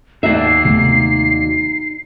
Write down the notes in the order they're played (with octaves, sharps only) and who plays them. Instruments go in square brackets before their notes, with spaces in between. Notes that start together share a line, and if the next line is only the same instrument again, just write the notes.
[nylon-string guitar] D#2 F#4 E5 [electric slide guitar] D#4 D5 [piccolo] C7
[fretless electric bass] C3 A3 B3